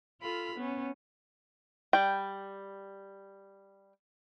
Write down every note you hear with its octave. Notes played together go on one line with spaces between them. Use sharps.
F4 A4 B5 F6
B3 C#4
G3 G5